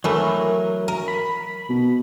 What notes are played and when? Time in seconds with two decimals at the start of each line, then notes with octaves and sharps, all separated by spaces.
0.04 E3 F#3 A3 A#4
0.88 A#4
1.08 B5
1.69 B2